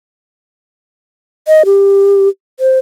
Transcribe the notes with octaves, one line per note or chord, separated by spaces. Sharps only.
D#5
G4
C5